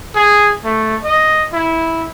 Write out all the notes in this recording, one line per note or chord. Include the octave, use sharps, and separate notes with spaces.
G#4
A3
D#5
E4